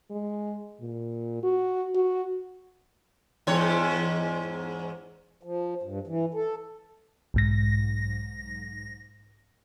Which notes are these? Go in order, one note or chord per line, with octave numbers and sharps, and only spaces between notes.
G#3
A#2
F#4
F#4
E2 G#2 C#5
F3
G2
E3
A4
B1 G#2 A#6